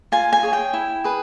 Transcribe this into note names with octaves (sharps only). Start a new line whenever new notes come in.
F4 G#5
G#5
G#4 C#5
G5
E4
G#4 B4